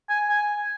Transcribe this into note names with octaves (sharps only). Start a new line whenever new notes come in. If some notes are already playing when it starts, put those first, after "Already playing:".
G#5
G#5